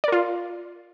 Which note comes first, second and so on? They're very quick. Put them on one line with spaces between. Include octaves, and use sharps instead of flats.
D5 A#4 F4